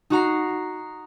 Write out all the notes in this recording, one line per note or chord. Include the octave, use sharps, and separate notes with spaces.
D#4 F#4 A#5 C7